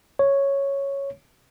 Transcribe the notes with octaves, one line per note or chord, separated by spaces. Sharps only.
C#5